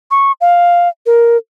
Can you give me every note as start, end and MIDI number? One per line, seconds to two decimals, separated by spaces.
0.11 0.32 85
0.41 0.89 77
1.06 1.37 70